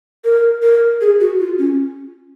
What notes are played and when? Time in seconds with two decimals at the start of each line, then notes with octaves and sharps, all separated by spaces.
0.25 A#4
0.63 A#4
1.01 G#4
1.20 F#4
1.40 F4
1.59 C#4